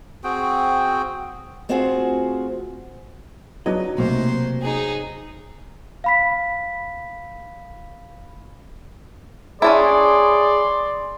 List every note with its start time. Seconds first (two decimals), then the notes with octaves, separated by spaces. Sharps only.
0.24 C4 F#4 G#4 G5
1.69 A3 C4 F4 F#4 G#4 C5
3.66 F#3 B3 D4 D#4 D#5
3.98 B1 C3 A3 A#3 C5
4.62 D#4 G#4
6.04 F5 B5 B6
9.62 C#4 D4 E4 G#4 D5 C6